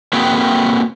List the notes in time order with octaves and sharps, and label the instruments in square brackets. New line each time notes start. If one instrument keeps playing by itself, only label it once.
[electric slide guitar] A#3 C4 F#4 G#4 B4 G5